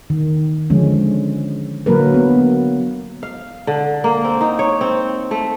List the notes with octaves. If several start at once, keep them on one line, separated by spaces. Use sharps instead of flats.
D#3
D3 F3 G#3 C#4
D3 F#3 A#3 A#4 B4
B3
F5
D3
A#3
C4
D#4
C#5
C4
A3